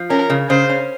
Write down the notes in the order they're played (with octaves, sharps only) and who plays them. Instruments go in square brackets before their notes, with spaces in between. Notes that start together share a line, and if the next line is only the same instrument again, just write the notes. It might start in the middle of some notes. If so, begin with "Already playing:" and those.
Already playing: [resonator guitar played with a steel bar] F3
[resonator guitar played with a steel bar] C#4 [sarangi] A#4
[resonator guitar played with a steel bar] C#3
[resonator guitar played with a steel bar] C#3 [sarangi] C5
[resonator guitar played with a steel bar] C#4